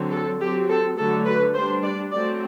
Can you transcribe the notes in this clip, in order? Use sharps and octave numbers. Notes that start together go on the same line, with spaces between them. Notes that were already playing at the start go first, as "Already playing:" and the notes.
Already playing: D3 F#3 C4
A4
F#3 C4 G4
A4
D3 F#3 A3 A4
B4
G3 D4 C5
D5
F#3 A3 C4 D5